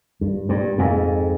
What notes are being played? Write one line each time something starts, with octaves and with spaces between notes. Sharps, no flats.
G2
G2
F2 G#2